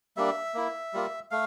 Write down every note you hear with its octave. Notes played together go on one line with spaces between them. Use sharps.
G3 A#3 D4 E5
A#3 E4
G3 A#3 F4
A3 F5